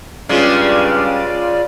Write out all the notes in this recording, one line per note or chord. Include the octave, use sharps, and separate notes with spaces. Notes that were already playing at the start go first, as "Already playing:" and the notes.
G2 C#3 G#3 C#4 F4 D5